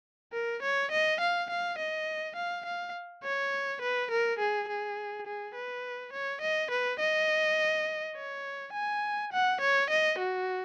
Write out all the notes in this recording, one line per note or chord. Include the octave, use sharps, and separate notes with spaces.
A#4
C#5
D#5
F5
F5
D#5
F5
F5
C#5
B4
A#4
G#4
G#4
G#4
B4
C#5
D#5
B4
D#5
C#5
G#5
F#5
C#5
D#5
F#4